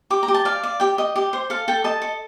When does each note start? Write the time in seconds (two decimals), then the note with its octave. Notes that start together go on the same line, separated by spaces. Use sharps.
0.10 G4 D6
0.23 A#5
0.28 G4
0.34 A5
0.45 D5 F5
0.63 D5
0.80 G4 G5
0.98 D#5
1.16 G4
1.33 C5
1.50 A4 F5
1.68 A4 G5
1.84 D#5 A5
2.02 A4